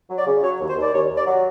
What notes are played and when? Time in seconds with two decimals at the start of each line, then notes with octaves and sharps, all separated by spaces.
0.10 F#3
0.18 D5
0.26 C#3
0.42 F#3 C#5
0.60 D#2
0.69 C5
0.77 D#2 D5
0.92 D#2 C#5
1.09 D#2
1.17 D5
1.26 F#3